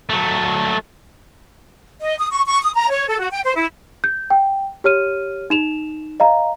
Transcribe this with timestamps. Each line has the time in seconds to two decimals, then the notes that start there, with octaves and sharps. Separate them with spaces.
0.09 F#3 A3
2.01 D#5
2.19 D#6
2.31 C#6
2.46 C#6
2.62 D#6
2.75 A#5
2.90 C#5
3.07 A4
3.20 F#4
3.32 G5
3.44 C5
3.56 E4
4.04 G6
4.30 G5
4.84 G4 C#5 F6 D#7
5.50 D#4 E7 F7
6.20 D#5 F5 A#5